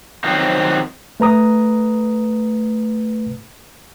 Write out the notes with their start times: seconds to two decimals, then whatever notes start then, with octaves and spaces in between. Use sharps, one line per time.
0.24 D#3 F3 F#3 C4 D#4
1.20 A3 B4 A#5 D#6